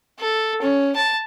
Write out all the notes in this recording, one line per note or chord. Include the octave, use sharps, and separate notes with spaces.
A4
C#4
A5